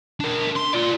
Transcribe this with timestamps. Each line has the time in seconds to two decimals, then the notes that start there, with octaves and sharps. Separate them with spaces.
0.20 D4 A#4
0.56 C6
0.73 F4 D5